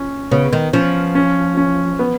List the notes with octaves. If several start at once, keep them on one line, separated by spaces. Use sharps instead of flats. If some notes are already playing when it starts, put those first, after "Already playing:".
Already playing: C#4
C#3 B3
D#3
F3 C#4
C#4
C#4
B3